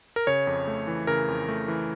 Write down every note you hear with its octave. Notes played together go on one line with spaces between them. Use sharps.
A#4
C#3 C#5
F2
A3
E3
C#3 A#4
F2
A3
E3